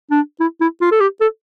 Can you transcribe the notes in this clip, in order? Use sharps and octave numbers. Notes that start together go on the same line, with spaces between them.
D4
E4
E4
F4
A4
G4
A4